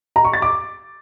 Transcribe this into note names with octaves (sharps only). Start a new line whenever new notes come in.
A#5
C#6
A6
D6